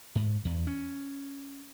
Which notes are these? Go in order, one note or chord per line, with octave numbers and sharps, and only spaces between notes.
G#2
E2
C#4